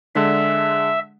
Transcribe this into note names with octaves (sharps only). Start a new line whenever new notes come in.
D3 G#3 D4 E5